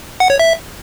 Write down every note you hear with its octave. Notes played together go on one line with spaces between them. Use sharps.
F#5
C#5
E5